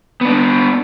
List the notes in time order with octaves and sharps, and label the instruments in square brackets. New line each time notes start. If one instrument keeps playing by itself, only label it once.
[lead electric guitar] B3 D4